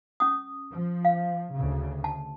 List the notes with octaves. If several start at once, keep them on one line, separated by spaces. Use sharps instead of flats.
C#4 D#6
F3
F5
D2 C#3
A5